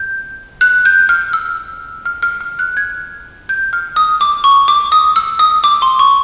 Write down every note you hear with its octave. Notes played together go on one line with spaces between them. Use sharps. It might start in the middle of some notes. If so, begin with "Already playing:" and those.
Already playing: G6
F#6
G6
F6
E6
F6
F6
F6
F#6
G#6
G6
F6
D#6
D6
C#6
D6
D#6
E6
D#6
D6
C6
C#6